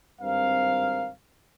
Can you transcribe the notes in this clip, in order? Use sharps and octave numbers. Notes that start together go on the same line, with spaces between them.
G#1 G2 C4 A#4 F5